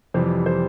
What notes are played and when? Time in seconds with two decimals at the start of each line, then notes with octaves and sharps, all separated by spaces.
0.14 F2 C3 E3 G3 C5
0.46 C5